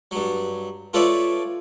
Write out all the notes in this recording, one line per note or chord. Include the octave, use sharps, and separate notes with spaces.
G2 F#3
F4 A4 B4 C#5 D5 E5